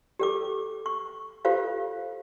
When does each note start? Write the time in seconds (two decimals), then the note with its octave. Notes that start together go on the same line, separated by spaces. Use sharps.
0.19 G4 A4 D6
0.86 C#6
1.45 F4 G4 A4 C5 F5